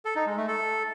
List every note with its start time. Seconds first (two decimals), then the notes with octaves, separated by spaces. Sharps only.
0.05 A4
0.16 D#4
0.26 G#3
0.37 A3
0.48 A4